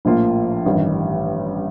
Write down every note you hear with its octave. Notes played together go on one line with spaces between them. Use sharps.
A#1 A2 F3 A#3 F4
A1 G2 D#3